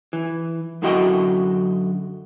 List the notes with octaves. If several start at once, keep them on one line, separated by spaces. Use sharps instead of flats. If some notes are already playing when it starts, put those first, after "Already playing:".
E3
F#2 D3 E4 F#4 D#5 G5